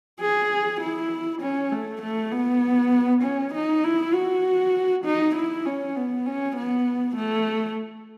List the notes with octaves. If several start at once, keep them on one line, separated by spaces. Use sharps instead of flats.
G#4
E4
C#4
A3
A3
B3
C#4
D#4
E4
F#4
D#4
E4
C#4
B3
C#4
B3
A3